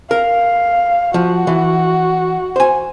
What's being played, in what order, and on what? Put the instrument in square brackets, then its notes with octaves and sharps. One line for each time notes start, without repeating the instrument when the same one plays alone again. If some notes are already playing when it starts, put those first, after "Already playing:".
[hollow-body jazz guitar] A#4 [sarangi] F5
[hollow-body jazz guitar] F3 [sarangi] F#4
[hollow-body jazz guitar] E3
C5 G#5